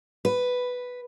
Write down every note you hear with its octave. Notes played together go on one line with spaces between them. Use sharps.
B4